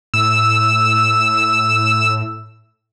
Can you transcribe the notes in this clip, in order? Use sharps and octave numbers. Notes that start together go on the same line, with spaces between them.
A2 E6